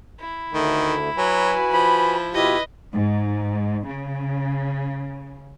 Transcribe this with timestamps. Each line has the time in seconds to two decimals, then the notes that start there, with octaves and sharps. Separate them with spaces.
0.20 E4
0.52 D2 D3 D#3 A3
1.18 F#3 F#4 B4 G#5
1.71 F3 B5
2.34 B2 E4 F4 G4 B4 D#5
2.92 G#2
3.85 C#3